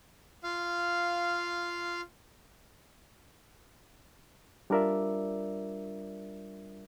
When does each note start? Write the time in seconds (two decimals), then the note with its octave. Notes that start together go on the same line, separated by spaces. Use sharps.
0.43 F4 F5
4.70 G3 D4 F4 A#4 D5 E5